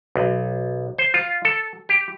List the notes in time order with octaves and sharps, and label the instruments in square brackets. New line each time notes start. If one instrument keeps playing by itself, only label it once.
[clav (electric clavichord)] B1
C5
F4
A4
G4